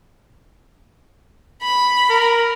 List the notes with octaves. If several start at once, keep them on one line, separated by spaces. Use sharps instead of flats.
B5
A#4